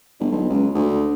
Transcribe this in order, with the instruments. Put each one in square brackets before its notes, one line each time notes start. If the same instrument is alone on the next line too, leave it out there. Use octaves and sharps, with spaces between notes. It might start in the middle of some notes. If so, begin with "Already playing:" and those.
[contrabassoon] G1
B1
C#2
D2